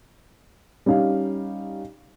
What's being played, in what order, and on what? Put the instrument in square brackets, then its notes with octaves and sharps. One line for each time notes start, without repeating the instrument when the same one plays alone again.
[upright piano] G3 C#4 D#4 F5